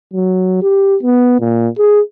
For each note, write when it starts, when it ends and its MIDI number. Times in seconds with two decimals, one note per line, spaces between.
0.14 0.60 54
0.62 0.96 67
1.03 1.37 59
1.40 1.68 46
1.79 2.00 68